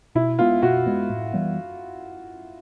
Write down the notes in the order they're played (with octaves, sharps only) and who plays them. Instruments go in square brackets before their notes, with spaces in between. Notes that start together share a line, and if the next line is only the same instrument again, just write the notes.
[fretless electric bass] B2 [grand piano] E4
[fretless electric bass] G#3 B3 [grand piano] F4
[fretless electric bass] B2 [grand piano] F#4
[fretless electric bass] G#3 B3
A2
E3 G3 B3